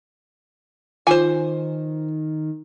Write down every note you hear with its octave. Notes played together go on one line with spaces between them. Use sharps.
D#3 F4 C5 G#5